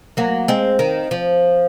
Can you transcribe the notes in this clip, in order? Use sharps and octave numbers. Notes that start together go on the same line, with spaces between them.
F#3 A#3
G#3 C4
D#3
F3